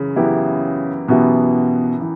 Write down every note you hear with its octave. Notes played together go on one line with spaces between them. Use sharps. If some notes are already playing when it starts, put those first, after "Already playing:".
Already playing: F#2 C#3 E3
F#2 E3 B3 E4 G4
F#2 B2 E3 B3 E4 G4
E3